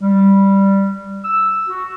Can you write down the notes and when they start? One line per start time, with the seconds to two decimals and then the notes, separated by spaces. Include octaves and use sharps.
0.02 G3
1.24 E6
1.68 F#4